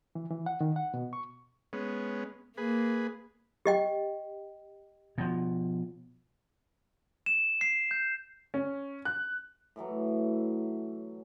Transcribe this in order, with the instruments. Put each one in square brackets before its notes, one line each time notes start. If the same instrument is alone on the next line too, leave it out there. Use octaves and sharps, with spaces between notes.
[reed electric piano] E3
E3
F#5
D#3
F#5
B2
C#6
[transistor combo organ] G#3 B3 C#4
[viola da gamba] A#3 [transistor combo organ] G#4 B4
[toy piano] G4 D#5 G5
[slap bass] B2 F3
[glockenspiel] E7
C7
G6
[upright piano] C#4
F#6
[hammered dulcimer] A2 E3 F#3 A3